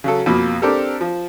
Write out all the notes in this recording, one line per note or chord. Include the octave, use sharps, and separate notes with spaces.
C#3 F#3 A4
F2 B2 A#3 B5
C4 D4 G4 A4 A#4
F3